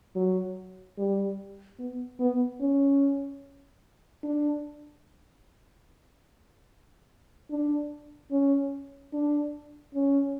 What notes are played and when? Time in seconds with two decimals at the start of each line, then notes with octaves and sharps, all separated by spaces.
0.15 F#3
0.98 G3
1.79 B3
2.20 B3
2.60 C#4
4.23 D4
7.50 D4
8.31 C#4
9.13 D4
9.94 C#4